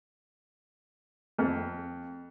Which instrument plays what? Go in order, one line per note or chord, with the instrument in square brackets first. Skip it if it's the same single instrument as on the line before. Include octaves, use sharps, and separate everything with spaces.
[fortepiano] F2